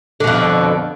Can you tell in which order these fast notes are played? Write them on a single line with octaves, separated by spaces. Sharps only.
D3 B2 F2